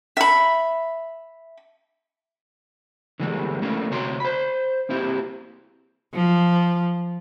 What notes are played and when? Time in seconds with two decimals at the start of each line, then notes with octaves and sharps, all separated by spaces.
0.17 E5 B5
3.20 D3 E3 G3 G#3 A#3
3.62 A3 A#3 C#4 E4 F4
3.90 D2 C3 F#4 C#5 A#5 C6
4.20 C5 B5
4.89 A#3 C4 E4 G4
6.15 F3